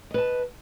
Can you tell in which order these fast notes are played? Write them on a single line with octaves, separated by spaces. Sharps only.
D#5 B4 A5